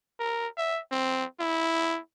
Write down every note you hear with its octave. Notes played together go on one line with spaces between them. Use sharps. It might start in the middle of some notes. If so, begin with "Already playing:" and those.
A#4
E5
C4
E4